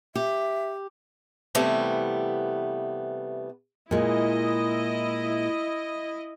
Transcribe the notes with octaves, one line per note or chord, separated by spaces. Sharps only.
G4 E5
C3 E3 G3 A3 B3
A#2 G#3 E4 D#5